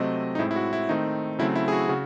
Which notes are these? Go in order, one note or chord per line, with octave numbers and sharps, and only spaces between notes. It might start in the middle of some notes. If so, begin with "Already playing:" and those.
Already playing: C3 F#3 A3 C4 D#5
D#4
A2 G#3 C4 E4
E4
F#4
E4
D#3 A3 C4 D#4
C#3 F#3 A3 C4 E4
E4
G#4
F#4
C#3 F#4